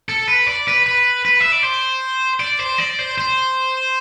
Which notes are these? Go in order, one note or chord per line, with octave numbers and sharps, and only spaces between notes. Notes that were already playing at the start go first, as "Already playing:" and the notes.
A4
B4
D5
B4
B4
B4
E5
D5
C5
D5
C5
D5
C5
C5